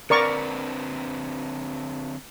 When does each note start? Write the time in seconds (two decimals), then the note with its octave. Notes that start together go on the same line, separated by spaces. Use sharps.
0.10 D3 C4 A#4 B4 D5 C#6